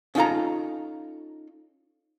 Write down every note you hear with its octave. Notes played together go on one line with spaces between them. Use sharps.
C#4 D#4 F4 A4 A#5